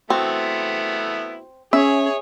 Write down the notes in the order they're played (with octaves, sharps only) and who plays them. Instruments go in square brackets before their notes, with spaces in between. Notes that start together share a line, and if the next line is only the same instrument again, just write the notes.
[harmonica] A3 B3 E4 [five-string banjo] C4 [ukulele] F#4
[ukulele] C#4 [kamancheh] G#4 C#5 [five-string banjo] E5